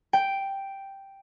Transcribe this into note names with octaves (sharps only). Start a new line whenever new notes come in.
G5